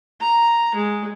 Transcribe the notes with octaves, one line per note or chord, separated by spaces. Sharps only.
A#5
G#3